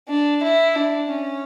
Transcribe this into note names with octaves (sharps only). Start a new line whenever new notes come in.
D4
E4
D4
C#4